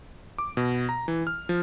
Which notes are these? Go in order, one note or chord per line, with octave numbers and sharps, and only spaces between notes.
D6
B2
A#5
E3
F6
F3